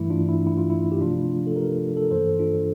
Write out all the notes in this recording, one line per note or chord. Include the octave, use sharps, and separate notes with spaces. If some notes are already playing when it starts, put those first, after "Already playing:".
Already playing: G2 E3 A3 E4
D4 F4
E4
E4
F4
E4
G4
C3 F3 A3 D4 F4
A4
G4 A#4
A4
A#4
G2 E3 A#3 A4 C5
D4 F4